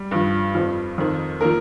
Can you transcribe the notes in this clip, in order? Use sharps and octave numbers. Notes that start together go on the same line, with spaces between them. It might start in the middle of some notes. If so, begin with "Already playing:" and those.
Already playing: G3
G2 F3
F2 F3
F2 D#3
F3 A#3 A#4